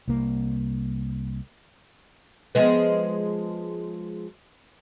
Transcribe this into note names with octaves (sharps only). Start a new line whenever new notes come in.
C2 A#3
F3 G#3 B3